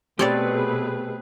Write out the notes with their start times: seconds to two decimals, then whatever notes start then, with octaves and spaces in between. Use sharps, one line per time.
0.19 B2 A3 C4 G4 G#4 B4 C#5 D5